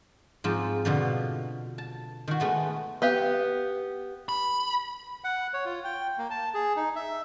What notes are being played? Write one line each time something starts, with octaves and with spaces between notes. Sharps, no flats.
G#2 F3 C4
B2 D3 F3
A5
D#3 F#4
G#3 A3 B3
B3 G4 F5
B5
F#5
C#5
F4
G5
A#3
A5
G#4
D#4
E5